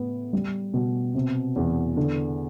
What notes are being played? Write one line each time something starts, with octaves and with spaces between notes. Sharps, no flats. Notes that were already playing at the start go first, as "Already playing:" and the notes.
Already playing: A2 B3
G3
B2
C3
E2
D3